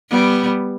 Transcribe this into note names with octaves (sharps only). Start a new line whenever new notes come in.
G3 B3